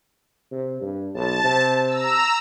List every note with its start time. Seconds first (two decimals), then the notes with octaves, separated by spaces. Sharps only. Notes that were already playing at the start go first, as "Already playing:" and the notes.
0.52 C3
0.81 G2
1.14 B1 A5
1.44 C3
1.87 A#5 E6